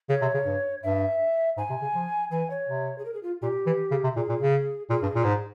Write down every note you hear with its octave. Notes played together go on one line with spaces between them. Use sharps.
C#3 C#5
C3
C#3
G2
G2 E5
G#2 G#5
C3
C#3
F3
E3 G#5
C#5
C3
G#4
A#4
G#4
F4
A#2 G4
E3
C#3
C3
A#2 G#4
A#2
C#3
A#2 G#4
G2
A#2
G#2